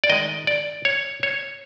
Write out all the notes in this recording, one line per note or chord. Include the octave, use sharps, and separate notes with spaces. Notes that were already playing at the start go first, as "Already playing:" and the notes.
D5
D#3 G#3 D#5
D5
C#5
C#5